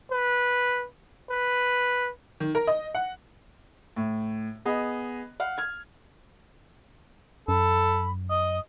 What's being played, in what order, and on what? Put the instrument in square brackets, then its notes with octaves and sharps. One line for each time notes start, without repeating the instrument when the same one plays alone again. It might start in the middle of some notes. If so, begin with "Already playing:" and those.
[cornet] B4
B4
[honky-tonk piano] D#3
A#4
D#5
F#5
[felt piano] A2
B3 G#4 D#5
F5 F#5
F6 G#6
[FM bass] F#2 [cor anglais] A4 [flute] B5
[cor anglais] D#5 [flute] D#6